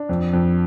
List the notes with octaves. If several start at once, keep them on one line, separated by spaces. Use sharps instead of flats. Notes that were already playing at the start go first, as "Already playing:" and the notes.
Already playing: D4
F2
F2